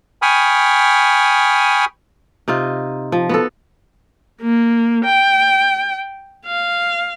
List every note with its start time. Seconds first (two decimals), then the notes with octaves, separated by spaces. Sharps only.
0.22 G5 G#5 B5 C#6 D#6 F6
2.48 C3 D#4 F4
3.12 F3
3.29 B3 F#4 A4
4.41 A#3
5.05 G5
6.46 F5